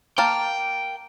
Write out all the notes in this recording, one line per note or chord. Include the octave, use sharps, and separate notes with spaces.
A#3 F5 G5 A5